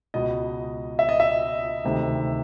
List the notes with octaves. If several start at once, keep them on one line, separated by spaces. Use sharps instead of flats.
C#2 B2 D#5
E5
D#5
E5
D2 C3 D#3